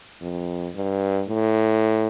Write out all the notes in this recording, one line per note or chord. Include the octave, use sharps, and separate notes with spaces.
F2
G2
A2